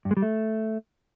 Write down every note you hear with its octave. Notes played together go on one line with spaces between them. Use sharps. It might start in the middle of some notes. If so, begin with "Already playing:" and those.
G2
G#3
G3
A3